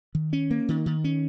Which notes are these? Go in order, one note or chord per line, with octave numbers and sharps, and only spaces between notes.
D#3
C#4
A#3
D#3
D#3
C#4